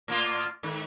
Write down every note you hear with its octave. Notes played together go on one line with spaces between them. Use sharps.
A2 A#3 F4
G#2 D#3